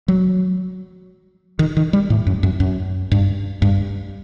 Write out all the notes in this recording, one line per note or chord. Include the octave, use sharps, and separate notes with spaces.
F#3
D#3
D#3
G3
A2
F#2
F#2
F#2
G2
G2